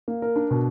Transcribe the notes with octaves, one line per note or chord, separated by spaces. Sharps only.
A#3
A#4
D4
B2